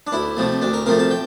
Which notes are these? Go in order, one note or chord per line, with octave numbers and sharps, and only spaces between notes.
D4
D2 E4
C3 F3 A3
D2 D4
A#4
C3 F3 A3 A#4
A5
G5